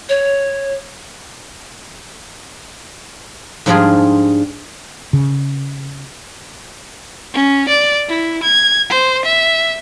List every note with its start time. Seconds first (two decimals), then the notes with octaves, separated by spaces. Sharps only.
0.09 C#5
3.66 G#2 F3 G3 D4 F4 G#4
5.13 C#3
7.34 C#4
7.69 D5
8.09 E4
8.43 G#6
8.90 C5
9.25 E5